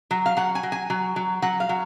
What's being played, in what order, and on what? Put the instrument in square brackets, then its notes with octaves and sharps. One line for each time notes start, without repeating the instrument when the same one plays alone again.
[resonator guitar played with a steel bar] F#3
F5
F#3 F#5
G#5
F#3
G#5
F#3
F#3
F#3 F#5
F5
F#3